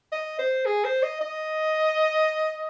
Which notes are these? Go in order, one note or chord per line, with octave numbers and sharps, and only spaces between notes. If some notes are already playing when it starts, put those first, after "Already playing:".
D#5
C5
G#4
C5
D#5
D#5